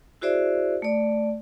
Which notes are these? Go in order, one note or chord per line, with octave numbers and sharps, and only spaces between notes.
E4 F#4 G#4 C5 D5 E5
A3 D5